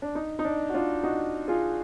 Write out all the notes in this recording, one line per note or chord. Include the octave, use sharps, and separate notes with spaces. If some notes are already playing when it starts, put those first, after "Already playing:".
D4
D#4
D#4
D4
F#4
D4 F4
D#4 F#4
F4 G#4